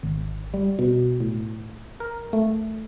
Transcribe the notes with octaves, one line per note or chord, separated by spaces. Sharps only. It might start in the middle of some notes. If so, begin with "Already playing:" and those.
G#1
G3
B2
A2
A#4
A3